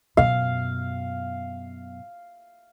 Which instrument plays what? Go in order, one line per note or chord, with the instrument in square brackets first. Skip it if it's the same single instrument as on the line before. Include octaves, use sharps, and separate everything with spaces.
[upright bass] F#2 B2 [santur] F5